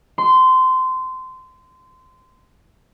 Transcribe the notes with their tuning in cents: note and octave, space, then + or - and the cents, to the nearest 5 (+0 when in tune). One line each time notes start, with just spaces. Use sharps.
C6 -20